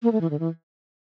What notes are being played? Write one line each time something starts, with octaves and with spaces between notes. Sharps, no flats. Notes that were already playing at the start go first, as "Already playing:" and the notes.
A#3
A3
E3
D3
E3